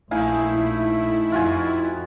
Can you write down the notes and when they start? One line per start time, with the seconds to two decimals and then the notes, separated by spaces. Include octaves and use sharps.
0.11 A#1 A3 D#4 E4 F5 G#5
1.32 F2 F4 F#4 G#5